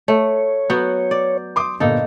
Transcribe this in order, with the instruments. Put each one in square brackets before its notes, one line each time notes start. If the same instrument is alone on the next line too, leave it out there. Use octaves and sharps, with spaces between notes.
[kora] A3 [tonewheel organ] C#5
[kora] F#3 B3 F#4 [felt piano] G6
[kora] D5
[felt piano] C6 D6 D#6
[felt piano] G1 A#2 [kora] A#3 D#4 A4